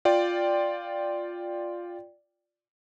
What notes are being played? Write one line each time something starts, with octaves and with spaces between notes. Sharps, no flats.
F4 D5 G5